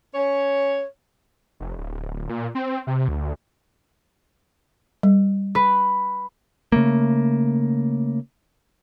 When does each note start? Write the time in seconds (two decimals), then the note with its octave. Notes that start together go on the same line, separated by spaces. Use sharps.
0.15 C#4 C#5
1.60 F1
1.78 D1
2.29 A#2
2.55 C4
2.87 C3
3.08 D2
5.03 G3
5.55 B4
6.72 C#3 A3 A#3